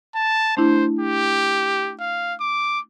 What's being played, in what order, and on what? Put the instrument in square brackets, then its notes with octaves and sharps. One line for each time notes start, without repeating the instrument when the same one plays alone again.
[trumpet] A5
[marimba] A3 D4 E4 [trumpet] C5
[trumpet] G4
F5
D6